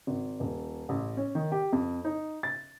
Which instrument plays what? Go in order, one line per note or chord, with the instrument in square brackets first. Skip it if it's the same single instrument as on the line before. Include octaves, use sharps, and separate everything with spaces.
[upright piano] G#1
D#1
A1
C#4
D#3
G4
F2
D#4
A6